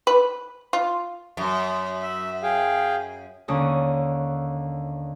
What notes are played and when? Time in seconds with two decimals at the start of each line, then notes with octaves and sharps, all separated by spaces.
0.07 B4
0.73 F4
1.37 F#2
2.02 E5
2.43 G#4 F5 G5
3.48 D#2 D3 C#4 D#6